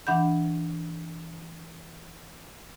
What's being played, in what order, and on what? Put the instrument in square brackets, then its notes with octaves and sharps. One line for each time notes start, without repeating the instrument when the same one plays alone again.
[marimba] E3 D4 F#5 B5 G6